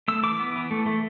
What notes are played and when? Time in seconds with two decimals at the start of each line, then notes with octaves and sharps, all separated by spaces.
0.08 A3 E6
0.23 E3 D6
0.39 B3
0.56 E3
0.71 A3
0.86 A3